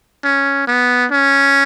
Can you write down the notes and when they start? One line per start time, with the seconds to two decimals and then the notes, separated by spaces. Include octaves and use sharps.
0.24 C#4
0.67 B3
1.11 C#4